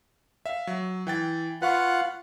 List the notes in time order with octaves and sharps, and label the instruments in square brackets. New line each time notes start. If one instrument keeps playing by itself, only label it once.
[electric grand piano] E5 F5
F#3
E3 G5 A6
[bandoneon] F4 F#5 [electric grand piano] B4 F5 C#6